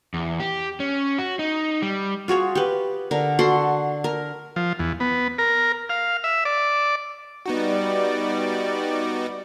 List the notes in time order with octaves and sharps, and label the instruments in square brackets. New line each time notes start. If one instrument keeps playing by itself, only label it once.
[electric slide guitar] E2
G4
C#4
F#4
D#4
G3
[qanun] F4 F#4 G#4 C#5
G4 B4
D3 A#4
F#4 A4 F#5 C6
A#4
[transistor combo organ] F3
E2
B3
A#4
F5
E5
D5
[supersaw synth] G3 D5 [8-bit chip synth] B3 D#4 F#4